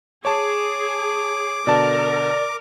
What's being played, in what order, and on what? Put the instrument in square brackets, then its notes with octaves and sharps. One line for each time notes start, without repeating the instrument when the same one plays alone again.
[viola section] G#4 [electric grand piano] C#5 A5 [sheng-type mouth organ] D6
[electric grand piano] B2 D3 A5 [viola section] A#4 [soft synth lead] D5